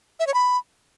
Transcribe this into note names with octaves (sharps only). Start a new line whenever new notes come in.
E5
C#5
B5